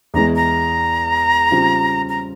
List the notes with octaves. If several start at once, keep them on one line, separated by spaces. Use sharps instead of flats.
E2 E3 G#3 A#5
A#5
C#3 G3 C4 F4
A#5